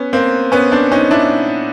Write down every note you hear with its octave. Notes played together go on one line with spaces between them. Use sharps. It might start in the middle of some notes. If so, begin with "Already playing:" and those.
Already playing: B3 C#4
A#3 C4
B3 C#4
C4 D4
C#4 D#4
D4 E4